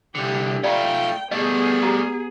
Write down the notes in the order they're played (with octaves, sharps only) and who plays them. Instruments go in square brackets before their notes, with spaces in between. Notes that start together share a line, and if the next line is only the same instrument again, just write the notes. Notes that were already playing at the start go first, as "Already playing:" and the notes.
[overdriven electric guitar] C2 D3 [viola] G4
[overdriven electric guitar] A3 F4 [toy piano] D5 A#5 B5 [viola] G5
[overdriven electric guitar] G3 A3 [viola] B3 G#4 [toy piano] D#5
[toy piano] G4 A#5 D#6